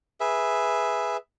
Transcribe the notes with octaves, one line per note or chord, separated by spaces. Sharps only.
G#4 B4 E5